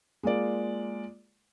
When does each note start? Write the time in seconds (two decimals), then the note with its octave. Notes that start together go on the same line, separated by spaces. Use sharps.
0.23 G#3 A#3 F4 D5